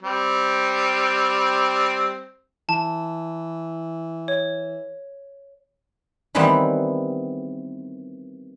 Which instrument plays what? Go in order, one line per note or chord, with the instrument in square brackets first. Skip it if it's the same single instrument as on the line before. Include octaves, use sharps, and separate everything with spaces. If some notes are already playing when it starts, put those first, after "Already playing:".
[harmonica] G3 C4
[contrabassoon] E3 [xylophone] A5
[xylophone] C#5
[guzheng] D#3 E3 G3 B3 C4